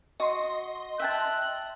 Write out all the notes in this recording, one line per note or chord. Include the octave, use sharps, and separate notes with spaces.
F#4 D#5 C6
E5 G5 A5 F#6